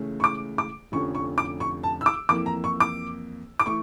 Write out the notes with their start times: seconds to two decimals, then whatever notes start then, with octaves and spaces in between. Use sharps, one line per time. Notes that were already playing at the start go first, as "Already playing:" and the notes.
Already playing: C#2 C#3 E3 A3 C#4
0.20 C#6
0.24 D6
0.58 D6
0.92 F1 F2 D3 F3 C#4 C#6
1.15 C#6
1.38 D6
1.60 C#6
1.83 A5
2.01 E6
2.06 D6
2.29 F2 E3 A#3 D6
2.46 A#5
2.64 C#6
2.80 D6
3.60 D6
3.66 E3 A3 C#6